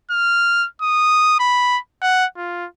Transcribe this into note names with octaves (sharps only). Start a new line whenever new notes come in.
F6
D#6
B5
F#5
F4